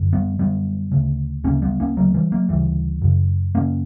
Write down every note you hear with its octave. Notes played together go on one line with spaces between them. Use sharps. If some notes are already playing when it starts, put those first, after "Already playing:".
Already playing: F#2 D3
G3 B3
F#2 D3 G3 B3
D2 C#3
D2 C#3 A#3 C#4
G3 B3
A#3 C#4
D2 C#3 F#3 A#3
E3 G3
F#3 A#3
D2 C#3 E3 G3
F#2 C#3
F#2 C#3 A#3 C#4